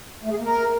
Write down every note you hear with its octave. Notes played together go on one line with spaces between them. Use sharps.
A3
G#4
A#3
A#4